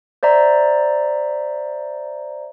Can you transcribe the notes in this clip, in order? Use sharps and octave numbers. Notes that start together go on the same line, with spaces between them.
C5 D5 E5 A#5